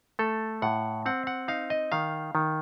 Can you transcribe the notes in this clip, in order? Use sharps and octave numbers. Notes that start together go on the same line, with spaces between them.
A3 A4
A2 F#5
C4 F#5
F#5
D#4 F5
D#5
D#3 F5
D#3